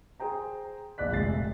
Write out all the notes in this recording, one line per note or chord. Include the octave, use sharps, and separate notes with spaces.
G#4 C5 G5 A#5
D1 A#1 D5 F#6 B6
F1 G#3 E5 A6 C7